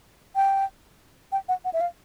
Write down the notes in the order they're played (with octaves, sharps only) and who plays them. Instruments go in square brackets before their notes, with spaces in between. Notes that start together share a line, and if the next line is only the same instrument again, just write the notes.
[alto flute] G5
G5
F#5
F#5
E5
F5